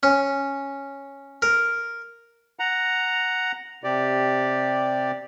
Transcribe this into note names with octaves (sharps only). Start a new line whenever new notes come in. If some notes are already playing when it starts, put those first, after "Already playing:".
C#4
A#4
F#5 A#5
C3 G4 D5